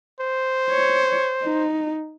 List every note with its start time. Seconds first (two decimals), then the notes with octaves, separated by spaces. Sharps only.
0.20 C5
0.70 C#5
1.44 D#4